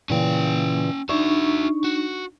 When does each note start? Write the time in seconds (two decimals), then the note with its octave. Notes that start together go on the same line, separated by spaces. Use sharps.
0.10 A#2 C#3 E3 C#4 G5
1.09 D4 D#4 F#4 D5 E5 C#6
1.84 F#4